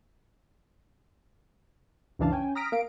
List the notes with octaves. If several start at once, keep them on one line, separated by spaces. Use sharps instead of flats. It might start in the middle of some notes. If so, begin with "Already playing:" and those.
C#2 F#2 E3 D4 F5 A5
C#4 G5 G#5
A#5 D#6 F6 A#6 B6 D7
A#3 F5 D7